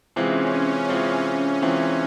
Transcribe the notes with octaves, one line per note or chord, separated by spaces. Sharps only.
C3 E3 G#3 C4 C#4 F4
C#4
C3 E3 G#3 C4 C#4 F4
C#4
C3 E3 G#3 C4 C#4 F4